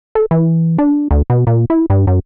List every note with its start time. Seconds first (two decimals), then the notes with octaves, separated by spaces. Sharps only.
0.15 A4
0.31 E3
0.78 D4
1.11 D2
1.30 B2
1.47 A#2
1.70 E4
1.90 G2
2.07 F#2